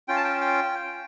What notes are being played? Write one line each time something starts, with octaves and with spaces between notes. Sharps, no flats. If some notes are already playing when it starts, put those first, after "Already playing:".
C#4 F4 G5
A5
G5
G5